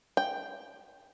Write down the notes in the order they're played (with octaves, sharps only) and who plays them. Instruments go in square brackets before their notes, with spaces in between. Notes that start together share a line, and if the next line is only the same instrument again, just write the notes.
[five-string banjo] G5